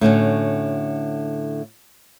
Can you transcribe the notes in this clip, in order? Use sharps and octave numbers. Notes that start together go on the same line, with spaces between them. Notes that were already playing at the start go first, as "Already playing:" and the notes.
A2 D3 C#4 F#4